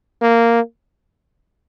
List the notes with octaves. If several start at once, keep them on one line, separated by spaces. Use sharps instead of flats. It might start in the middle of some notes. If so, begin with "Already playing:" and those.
A#3